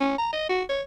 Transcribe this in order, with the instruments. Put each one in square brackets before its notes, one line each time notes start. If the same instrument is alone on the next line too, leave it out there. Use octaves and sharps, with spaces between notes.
[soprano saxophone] C#4
A#5
D#5
F#4
C#5